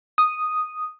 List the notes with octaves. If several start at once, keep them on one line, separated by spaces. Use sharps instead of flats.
D#6